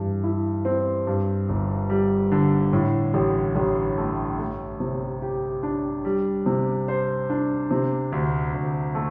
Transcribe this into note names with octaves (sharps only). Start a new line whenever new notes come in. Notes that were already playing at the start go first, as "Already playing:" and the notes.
Already playing: G2 E3
E4
C4
G2
G1
G3
D3
A2
A1
A1
A3
A3
C3
G4
D4
G3
C3
C5
D4
C3
D2
D2
A3